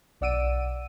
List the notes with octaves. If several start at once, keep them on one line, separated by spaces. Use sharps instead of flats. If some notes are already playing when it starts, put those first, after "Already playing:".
B1 D5 F#5 E6 D7 D#7